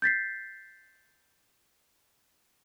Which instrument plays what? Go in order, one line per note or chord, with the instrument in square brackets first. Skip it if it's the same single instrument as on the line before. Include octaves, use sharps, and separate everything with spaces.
[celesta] G6 A6 B6 C7